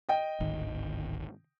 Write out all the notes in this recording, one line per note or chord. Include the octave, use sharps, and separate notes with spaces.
D#5 G5
D1 G#1 D#3